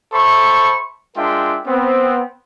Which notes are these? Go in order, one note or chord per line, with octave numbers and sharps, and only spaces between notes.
A4 C5 E5 B5 C#6
G#3 D4 F4 A#4 E5 G5
B3 C4